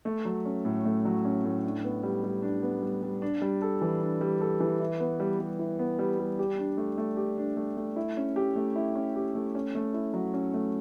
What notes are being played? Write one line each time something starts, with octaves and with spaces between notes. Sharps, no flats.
A3
F#3
C#4
A2
A3
F#3
C#4
A2
D4
B3
G3
G3
D4
B3
G3
G3
D4
G3
A4
E3
D4
G3
A4
E3
E4
B3
G3
G3
E4
B3
G3
G3
G4
D4
A3
A3
G4
D4
A3
A3
E4
C#4
G4
A3
E4
C#4
G4
A3
C#4
A3
E4
F#3
C#4
A3